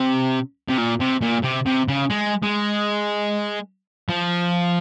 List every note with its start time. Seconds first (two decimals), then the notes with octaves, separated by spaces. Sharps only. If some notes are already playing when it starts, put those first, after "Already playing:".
Already playing: C3
0.69 C3
0.78 A#2
1.00 C3
1.22 A#2
1.44 C3
1.66 C3
1.89 C#3
2.10 G#3
2.43 G#3
4.09 F3